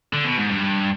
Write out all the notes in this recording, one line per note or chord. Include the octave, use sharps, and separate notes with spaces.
D3
B2
G#2
G2